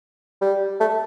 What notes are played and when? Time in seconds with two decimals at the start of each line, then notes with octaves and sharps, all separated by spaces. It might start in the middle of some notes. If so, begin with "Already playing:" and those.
0.42 G3
0.80 A3